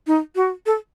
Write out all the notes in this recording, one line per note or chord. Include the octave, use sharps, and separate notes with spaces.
D#4
F#4
A4